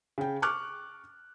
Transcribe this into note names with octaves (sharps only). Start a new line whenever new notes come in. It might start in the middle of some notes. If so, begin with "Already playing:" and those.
C#3 G5
C#6 D6 F6 F#6